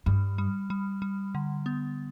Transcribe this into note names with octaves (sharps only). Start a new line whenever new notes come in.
G2 G3
G3
G3
G3
D3
B3